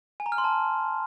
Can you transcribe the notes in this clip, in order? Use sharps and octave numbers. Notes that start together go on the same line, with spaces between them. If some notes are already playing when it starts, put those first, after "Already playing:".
G#5
A#5
F6
C6
A5